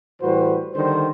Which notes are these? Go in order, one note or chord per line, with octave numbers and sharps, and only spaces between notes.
A2 E3 G3 F#4 B4 C5
D3 D#3 G3 C5